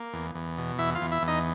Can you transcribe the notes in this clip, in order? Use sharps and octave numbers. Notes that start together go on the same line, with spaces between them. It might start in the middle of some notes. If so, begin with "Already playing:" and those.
Already playing: A#3
E2
E2
B2
E2 E4 E5
F4 F5
E2
E4 E5
E2
D#4 D#5